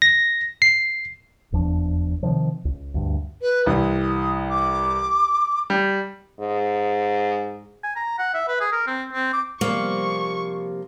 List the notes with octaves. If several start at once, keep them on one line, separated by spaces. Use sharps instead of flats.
A#6
C7
F1 E2 F3 D4
C3 D#3 F3
C#2
D2 G2
B4
C2 E3 D#6
D6
G3
G#2
G#5
A#5
F#5
E5
B4
G#4
A#4
C4
C4
D6
C3 F3 G3 A#3 C#6